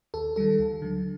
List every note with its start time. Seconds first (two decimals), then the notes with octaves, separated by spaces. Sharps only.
0.14 D#2 A4
0.36 D#3 G3 A4
0.59 D2
0.82 D3 F#3